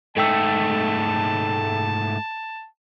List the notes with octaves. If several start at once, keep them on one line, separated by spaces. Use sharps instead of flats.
G#2 A3 A4 G5 A5 E6